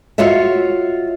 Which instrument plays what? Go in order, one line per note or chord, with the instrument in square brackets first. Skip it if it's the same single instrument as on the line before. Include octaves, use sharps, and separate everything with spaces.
[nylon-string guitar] F4 F#4 C#5 D#5 E5